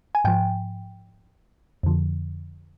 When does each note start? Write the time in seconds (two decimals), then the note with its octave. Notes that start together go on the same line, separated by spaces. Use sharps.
0.15 G#5
0.25 G#2 F3 G5
1.83 F2 D3 F3